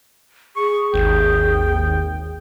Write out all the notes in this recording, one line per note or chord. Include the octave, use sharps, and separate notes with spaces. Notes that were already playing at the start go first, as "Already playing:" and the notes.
G#4 C#6
G#1 D#2 G5